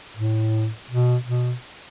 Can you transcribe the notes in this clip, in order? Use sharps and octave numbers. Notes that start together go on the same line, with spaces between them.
A2
B2
B2